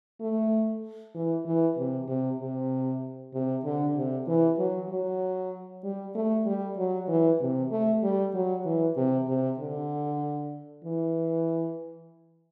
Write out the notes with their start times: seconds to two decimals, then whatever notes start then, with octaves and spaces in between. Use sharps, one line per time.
0.21 A3
1.15 E3
1.45 E3
1.77 C3
2.08 C3
2.40 C3
3.34 C3
3.65 D3
3.96 C3
4.27 E3
4.58 F#3
4.90 F#3
5.84 G3
6.15 A3
6.46 G3
6.77 F#3
7.08 E3
7.41 C3
7.71 A3
8.03 G3
8.34 F#3
8.66 E3
8.97 C3
9.28 C3
9.59 D3
10.84 E3